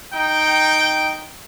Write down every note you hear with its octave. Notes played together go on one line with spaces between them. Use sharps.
D#4 G5